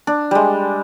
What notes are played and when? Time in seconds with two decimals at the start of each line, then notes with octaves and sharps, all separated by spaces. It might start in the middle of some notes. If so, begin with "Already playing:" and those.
0.07 D4
0.31 G3 G#3